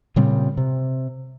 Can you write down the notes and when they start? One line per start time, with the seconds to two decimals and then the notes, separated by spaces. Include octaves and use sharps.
0.16 A#2 C#3 G3 C4
0.57 C3